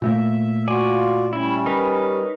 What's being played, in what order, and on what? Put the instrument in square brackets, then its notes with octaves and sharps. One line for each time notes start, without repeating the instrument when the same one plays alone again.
[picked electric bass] A#2 A3 A#3 [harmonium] E5
[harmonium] F4 F#4 [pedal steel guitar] D5 G#5
[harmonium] G3 C#4 [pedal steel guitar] E4
[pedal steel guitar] D#4 A#4 B4